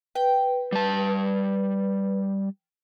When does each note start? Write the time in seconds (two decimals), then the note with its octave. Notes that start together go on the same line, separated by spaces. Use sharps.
0.15 B4 G5
0.72 G3 A5